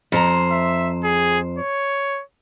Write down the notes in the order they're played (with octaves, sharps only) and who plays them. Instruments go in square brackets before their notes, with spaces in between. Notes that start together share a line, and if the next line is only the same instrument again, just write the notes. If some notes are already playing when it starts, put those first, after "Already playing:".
[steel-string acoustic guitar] F2 C5 A#5
[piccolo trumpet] E5
G#4
C#5